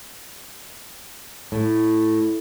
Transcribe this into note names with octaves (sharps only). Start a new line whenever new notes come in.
A2